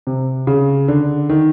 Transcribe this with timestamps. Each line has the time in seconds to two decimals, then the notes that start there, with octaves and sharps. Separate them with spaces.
0.07 C3
0.47 C#3
0.88 D3
1.29 D#3